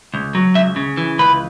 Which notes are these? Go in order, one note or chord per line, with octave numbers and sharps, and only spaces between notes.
C#2
F#3
C#2 E5
C#3
E3
C#2 B4